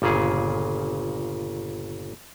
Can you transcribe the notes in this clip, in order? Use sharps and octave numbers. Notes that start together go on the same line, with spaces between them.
G1 A#2 C#3 G#4